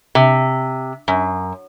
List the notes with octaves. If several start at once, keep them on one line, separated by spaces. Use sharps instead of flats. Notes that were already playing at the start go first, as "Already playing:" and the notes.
C3
F#2